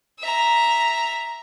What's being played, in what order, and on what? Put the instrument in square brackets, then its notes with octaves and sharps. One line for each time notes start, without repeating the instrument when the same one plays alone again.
[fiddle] E5 A#5